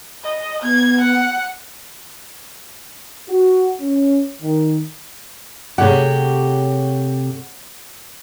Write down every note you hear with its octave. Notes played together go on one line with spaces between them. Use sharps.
D#5
B3 G#6
F#5
F#4
C#4
D#3
C3 A3 G4 G#4 C#5 F#5